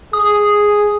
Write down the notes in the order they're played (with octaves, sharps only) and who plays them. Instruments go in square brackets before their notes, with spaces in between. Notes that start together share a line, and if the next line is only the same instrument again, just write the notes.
[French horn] G#4 [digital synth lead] D#6